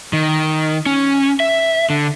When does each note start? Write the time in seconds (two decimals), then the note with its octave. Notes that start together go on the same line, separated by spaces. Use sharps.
0.13 D#3
0.86 C#4
1.40 E5
1.90 D3